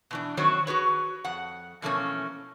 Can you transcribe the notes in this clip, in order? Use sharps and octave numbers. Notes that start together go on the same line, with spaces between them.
B2 E3 D4
D#3 E3 F#3 C4 C5 C#5
F#4 G#4 B4 C#5
F2 F#5
B2 E3 F3 A3 A#3 C#4